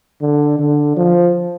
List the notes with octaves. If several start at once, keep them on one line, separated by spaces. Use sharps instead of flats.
D3
D3
F3